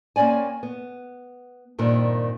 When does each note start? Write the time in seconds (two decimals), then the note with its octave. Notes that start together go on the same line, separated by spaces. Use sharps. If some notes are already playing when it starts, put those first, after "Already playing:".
0.16 A#3 C4 C#4 D5 G#5
0.63 B3
1.79 G2 A#2 D#3 C4